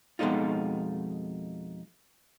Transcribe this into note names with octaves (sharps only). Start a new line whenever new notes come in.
F2 B2 G#3 A3 D#4 F4